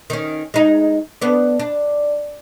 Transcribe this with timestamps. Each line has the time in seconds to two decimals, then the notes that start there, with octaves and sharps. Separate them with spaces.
0.10 D#3 C#4
0.54 G#3 D#4
1.22 B3 D4
1.59 D4